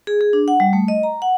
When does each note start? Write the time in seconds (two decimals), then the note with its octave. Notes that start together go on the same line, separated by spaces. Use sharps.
0.07 G#4
0.21 G#4
0.33 D4
0.48 F#5
0.60 G3
0.73 A3
0.88 D#5
1.03 A#5
1.22 F#5